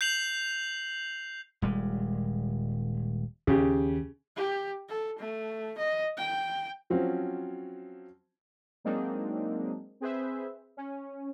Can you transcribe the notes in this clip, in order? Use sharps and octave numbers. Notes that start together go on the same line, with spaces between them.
G6 C7 F7 F#7
D#1 G3 G#3
D#2 C#3 G4
G4
A4
A3
D#5
G5
F3 F#3 C4 C#4 F4
F#3 G#3 A#3 C4 D4 D#4
C4 G#4 B4 C5 E5
C#4